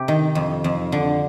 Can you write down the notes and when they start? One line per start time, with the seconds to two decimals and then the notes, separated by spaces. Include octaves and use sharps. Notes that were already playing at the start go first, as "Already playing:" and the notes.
Already playing: C3 G4
0.08 D#3
0.35 F2
0.64 F2
0.92 D3